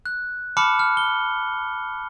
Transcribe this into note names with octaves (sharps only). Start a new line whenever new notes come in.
F#6
A5 B5 D6 F6 C#7
F6
G7